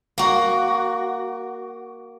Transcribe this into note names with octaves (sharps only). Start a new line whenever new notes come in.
A#3 F#4